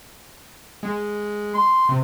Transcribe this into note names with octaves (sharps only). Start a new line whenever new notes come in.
G#3
C6
C3